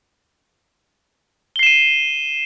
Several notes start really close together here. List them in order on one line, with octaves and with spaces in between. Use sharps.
G7 C7 E7 D#7